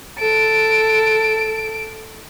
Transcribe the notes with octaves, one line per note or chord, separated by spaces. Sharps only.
A4 D7